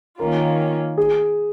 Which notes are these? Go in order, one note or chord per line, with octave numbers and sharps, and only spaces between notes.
D#3 A#3 C#4 F4 A#4
G#4